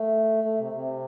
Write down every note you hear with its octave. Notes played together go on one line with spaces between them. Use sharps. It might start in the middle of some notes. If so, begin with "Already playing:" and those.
Already playing: A3
A3
C3
C3